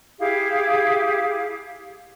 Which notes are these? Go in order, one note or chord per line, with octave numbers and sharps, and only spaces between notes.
E4 G4 G#4 F5